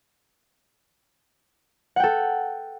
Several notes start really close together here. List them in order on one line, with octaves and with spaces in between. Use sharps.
F#5 G5 A4